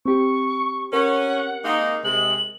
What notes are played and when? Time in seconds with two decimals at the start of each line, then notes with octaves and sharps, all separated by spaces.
0.06 C4 G4 C#6
0.93 C#4 A#4 F#5
1.65 G#3 A#3 D#4
2.05 C3 G#3 F#7